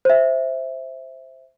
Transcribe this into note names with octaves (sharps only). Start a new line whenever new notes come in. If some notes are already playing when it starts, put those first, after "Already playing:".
C5 E5